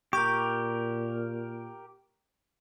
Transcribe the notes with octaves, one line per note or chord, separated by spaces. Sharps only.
A#2 G4 A#4 C#6 G6